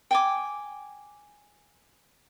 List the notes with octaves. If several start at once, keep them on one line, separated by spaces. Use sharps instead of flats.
G5 G#5 D6